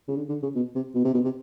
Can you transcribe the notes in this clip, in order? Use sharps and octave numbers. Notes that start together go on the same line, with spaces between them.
C#3
D3
D3
C#3
B2
C3
B2
C3
B2
C3